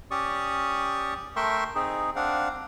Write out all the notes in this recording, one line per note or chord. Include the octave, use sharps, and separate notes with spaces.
C#4 G4 D5 C#6 D#6
A3 A#4 E5 G5 C6 C#6
C4 D#4 G#4
C4 D4 F5 F#5